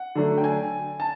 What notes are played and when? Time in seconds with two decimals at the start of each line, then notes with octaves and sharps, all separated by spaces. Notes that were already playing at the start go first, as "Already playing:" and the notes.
Already playing: F#5
0.15 D3 F#3 A3
0.38 G5
0.44 G#5
1.00 A5